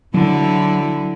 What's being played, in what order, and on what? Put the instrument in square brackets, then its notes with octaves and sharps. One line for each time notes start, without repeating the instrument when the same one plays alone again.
[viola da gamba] D3 E4 [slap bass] F#3